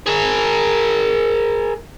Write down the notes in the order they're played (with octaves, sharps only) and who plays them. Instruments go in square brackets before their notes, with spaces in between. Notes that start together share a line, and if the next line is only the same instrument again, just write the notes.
[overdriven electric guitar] G#4 A#4